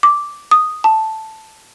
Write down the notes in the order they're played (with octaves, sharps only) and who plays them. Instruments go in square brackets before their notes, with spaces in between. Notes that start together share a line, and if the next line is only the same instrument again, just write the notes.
[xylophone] D6
D#6
A5